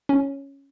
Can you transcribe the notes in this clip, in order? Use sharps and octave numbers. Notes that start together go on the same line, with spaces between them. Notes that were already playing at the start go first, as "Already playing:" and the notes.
C#4